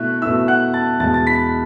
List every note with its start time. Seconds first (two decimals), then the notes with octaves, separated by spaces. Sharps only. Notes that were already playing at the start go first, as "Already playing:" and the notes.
Already playing: B2 A3 E4 E5 F#6
0.21 B2 A3 E4 E5 E6
0.48 F#5 F#6
0.74 A5 A6
1.00 E2 B2 G#3 A5 A6
1.14 A6
1.27 B5 B6